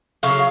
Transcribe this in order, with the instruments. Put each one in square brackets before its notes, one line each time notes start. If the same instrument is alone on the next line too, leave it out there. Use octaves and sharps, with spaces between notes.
[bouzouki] C#3 F#3 F5